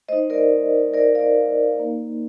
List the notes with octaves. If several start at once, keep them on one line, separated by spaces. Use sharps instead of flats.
A3 D#4 C5 D#5
A#4 D5
A#4 D5
D5 F5
A#3 D#4